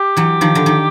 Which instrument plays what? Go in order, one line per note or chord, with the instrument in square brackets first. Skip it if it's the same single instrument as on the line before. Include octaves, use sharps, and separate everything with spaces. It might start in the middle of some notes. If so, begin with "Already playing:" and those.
Already playing: [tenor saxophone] G4
[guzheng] E3 F#3
D#3 F3
D3
D#3